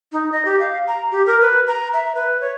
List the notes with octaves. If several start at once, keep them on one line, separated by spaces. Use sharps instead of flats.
D#4
D#5
G4
F5
A#5
G4
A#4
B4
A#5
E5
B4
C#5